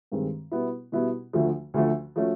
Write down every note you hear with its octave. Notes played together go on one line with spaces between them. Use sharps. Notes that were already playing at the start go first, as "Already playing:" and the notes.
G2 D#3 G#3 C4
B2 G3 B3 E4
B2 G3 B3 E4
D2 D3 F3 A3
D2 D3 F3 A3
F3 A3 C#4 F#4